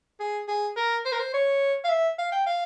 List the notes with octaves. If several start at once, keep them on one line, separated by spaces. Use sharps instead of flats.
G#4
G#4
A#4
C5
A#4
C5
C#5
F5
E5
F5
G5
F5